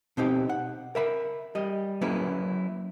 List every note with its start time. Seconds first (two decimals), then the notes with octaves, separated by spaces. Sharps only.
0.17 B2 C4 D#4 G4
0.49 F#5
0.95 A#4 E5 B5
1.55 G3 D#5
2.01 F#3 A#3 C#4 E4 G#4 B4